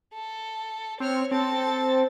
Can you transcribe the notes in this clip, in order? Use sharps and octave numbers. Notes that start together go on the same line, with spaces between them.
A4
C4 C#5 F6
C4 A4 A6